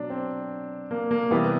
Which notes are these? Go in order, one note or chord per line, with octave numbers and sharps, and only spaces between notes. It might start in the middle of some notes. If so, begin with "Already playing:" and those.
Already playing: B2 F#3 D4
C4
A#3
A#3
C3 E3 G3 B3